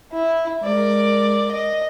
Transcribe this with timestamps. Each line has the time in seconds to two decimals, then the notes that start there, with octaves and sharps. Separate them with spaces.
0.13 E4
0.64 G#3 A#4 D5
1.52 D#5